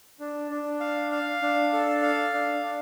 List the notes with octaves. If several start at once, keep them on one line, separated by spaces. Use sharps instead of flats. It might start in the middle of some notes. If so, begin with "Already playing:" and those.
D4
D4
F5
F5
D4
A4
F5
D4
D4